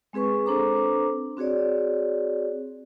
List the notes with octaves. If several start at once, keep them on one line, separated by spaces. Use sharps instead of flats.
G#3 C4 G#4 B4 C#6
C4 D4 A4 C5 A#5 D6
C4 F#4 G#4 C#5 D5